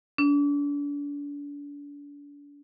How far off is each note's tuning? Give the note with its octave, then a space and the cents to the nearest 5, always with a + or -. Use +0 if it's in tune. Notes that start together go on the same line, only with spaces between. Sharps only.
D4 -35